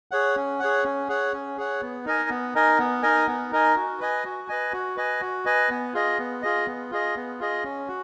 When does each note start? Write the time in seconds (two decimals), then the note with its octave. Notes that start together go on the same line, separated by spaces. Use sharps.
0.11 G#4 C#5 F#5
0.36 C#4
0.60 G#4 C#5 F#5
0.84 C#4
1.08 G#4 C#5 F#5
1.33 C#4
1.57 G#4 C#5 F#5
1.81 B3
2.05 D#4 A#4 D#5 G#5
2.30 B3
2.55 D#4 A#4 D#5 G#5
2.79 B3
3.03 D#4 A#4 D#5 G#5
3.27 B3
3.51 D#4 A#4 D#5 G#5
3.76 F#4
4.00 B4 D#5 G#5
4.25 F#4
4.48 B4 D#5 G#5
4.73 F#4
4.96 B4 D#5 G#5
5.21 F#4
5.45 B4 D#5 G#5
5.69 B3
5.94 F4 G#4 D#5
6.19 B3
6.42 F4 G#4 D#5
6.67 B3
6.91 F4 G#4 D#5
7.16 B3
7.40 F4 G#4 D#5
7.64 C#4
7.88 F#4